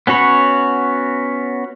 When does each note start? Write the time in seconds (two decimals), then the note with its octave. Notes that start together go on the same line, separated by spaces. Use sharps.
0.07 B3 C#4 F#4 C#5 B5